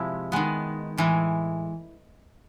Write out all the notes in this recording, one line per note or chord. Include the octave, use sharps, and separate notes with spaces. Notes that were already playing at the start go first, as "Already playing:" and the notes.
Already playing: C3 F3 G#3 E4
D#3 G#3 B3
A2 E3 G#3